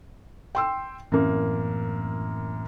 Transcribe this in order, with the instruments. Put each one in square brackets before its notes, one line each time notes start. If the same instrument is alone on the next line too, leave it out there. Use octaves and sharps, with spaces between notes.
[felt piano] G5 C6 E6
[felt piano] F#2 A#3 [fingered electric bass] A2 E3 C4